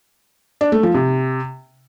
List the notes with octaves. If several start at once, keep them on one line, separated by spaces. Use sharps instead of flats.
D4
A3
F3
C3